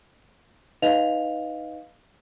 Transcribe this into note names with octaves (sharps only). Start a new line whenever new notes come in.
D#4 B4 D#5 F5 F7